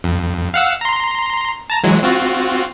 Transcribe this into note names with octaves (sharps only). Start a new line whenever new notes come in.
F2
F5 F#5 E6
A#5 C6
A5 A#5
E3 F#3 G#3
C4 F4 F#4